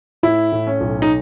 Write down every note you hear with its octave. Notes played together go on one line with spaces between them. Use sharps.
A2 E4
A2
C#4
B1
D#4